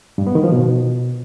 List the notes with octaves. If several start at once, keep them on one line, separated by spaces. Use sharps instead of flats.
G2
B3
D#3
F3
B2